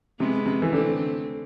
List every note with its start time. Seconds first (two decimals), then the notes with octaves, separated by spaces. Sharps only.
0.19 C3 G#3 B3
0.46 C3
0.62 E3
0.72 D3 A3 C4